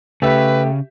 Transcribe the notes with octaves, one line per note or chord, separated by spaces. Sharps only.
C#3 A3 G4 B4 E5